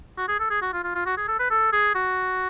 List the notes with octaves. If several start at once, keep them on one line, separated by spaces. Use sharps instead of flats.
F#4
G#4
A4
G#4
F#4
F4
F4
F4
F#4
G#4
A4
B4
A4
G#4
F#4